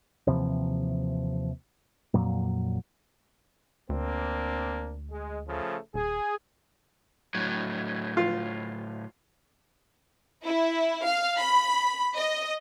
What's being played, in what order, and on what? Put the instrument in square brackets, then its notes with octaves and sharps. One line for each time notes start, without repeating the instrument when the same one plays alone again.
[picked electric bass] D#2 C3 E3 F3
F2 A#2 F#3
[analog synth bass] D2 [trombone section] A#3 C4 D4
[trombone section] G#3
C#3 F3 A3
[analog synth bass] D#1 [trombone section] G#4
[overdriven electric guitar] A2 F#3
[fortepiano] F4
[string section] E4
F5
B5
D#5